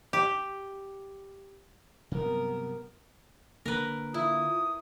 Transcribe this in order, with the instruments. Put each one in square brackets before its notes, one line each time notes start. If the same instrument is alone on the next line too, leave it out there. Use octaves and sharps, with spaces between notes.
[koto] G4
[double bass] G2 B3 [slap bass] C3 F#3 G3 [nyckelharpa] A#4
[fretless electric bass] D3 A#3 [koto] A#4 B4
[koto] E4 [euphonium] F4 [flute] D#6